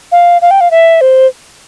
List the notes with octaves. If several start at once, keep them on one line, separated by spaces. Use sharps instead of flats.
F5
F5
G5
F5
E5
C5